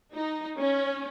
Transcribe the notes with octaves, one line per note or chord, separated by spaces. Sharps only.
D#4
C#4